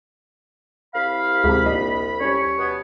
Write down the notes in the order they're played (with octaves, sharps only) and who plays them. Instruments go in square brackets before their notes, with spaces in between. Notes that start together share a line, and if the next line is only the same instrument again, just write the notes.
[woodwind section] C2 B5 [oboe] F5
[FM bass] D2 [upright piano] G#2 C3
[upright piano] A#1 D4 D#5
[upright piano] G3 C#4 [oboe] C#5
[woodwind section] B2 B3